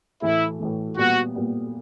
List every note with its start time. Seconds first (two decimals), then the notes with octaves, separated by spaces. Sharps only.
0.22 A2 E3 A3 E4
0.60 A2 E3 A3
0.97 A#2 G3 B3 F#4
1.35 A#2 G3 B3